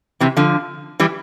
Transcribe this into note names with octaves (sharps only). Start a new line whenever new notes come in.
C3 E3
D3 F3
E3 G3